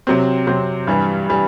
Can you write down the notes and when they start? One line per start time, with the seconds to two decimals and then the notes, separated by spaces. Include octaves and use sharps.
0.07 C3 F#3 C4
0.47 C3 F#3 C4
0.87 G2 E3 G3
1.29 E3 G3